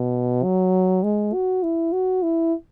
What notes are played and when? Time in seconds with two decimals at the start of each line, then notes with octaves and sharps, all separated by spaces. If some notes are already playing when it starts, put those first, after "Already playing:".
Already playing: B2
0.44 F#3
1.03 G#3
1.34 F#4
1.63 E4
1.93 F#4
2.23 E4